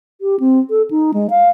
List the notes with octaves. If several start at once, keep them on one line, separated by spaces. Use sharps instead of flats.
G4
C4
A4
D#4
G#3
F5